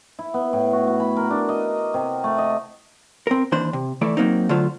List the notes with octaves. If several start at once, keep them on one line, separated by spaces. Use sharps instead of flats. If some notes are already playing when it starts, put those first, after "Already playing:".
E4
B3
A2
F#4
F#4
B5
A#4
D4
D#5
C3
A3
D#5
C4 A#4
D#2 E3 D4 C5
C3
E3 A3 D5
F#3 A#3 C4 D#4
D3 F#3 A3 F4 C5